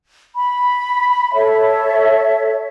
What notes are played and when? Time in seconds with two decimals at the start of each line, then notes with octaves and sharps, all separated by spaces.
0.36 B5
1.34 A4 C#5 E5